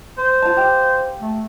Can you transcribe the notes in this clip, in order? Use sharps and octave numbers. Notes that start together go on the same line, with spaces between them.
C5
F4 A5
G4 F5
A3